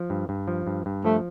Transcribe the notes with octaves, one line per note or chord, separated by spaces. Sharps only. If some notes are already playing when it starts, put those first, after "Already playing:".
Already playing: F3
G2
G2
F3
G2
G2
F3 A3